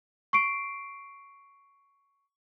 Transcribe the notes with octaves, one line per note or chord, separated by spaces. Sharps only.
C#6 C7 D7